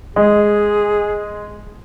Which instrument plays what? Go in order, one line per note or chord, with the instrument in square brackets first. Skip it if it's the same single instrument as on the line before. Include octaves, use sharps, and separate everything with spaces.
[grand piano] G#3 [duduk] G#4